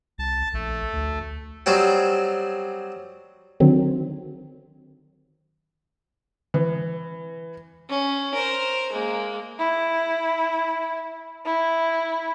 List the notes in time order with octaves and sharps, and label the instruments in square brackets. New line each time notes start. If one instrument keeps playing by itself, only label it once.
[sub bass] C2 [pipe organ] A5
[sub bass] A#1 [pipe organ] A3
[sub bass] D2
[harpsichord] F#3 G3 C4 G4 G#4 C5
[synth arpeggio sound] D3 D#3 F#3 C4
[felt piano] E3
[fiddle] C#4
A#4 C5
G#3 A#3
[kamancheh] E4
E4